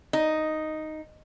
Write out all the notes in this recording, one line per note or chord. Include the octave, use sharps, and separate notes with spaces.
D#4